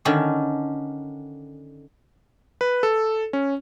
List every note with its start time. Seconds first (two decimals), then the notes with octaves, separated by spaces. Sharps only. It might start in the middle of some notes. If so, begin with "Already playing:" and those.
0.05 D3 D#3 C#4 D4
2.61 B4
2.83 A4
3.33 C#4